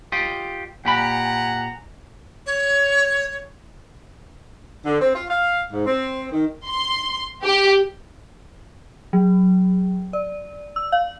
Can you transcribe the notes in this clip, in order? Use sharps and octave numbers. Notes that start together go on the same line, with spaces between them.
F4 G4 D#5
A#2 G4 F#5 G#5 A#5 B5
C#5
D3
C4
F4
F5
G#2
C4
D#3
C6
G4
F#3
D5
E6
F5